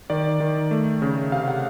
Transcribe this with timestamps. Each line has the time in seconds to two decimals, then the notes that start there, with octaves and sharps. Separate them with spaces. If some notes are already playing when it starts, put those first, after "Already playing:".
0.10 D#3 D5
0.40 D#3
0.71 A3
1.02 C#3
1.32 C3 F5
1.48 F#5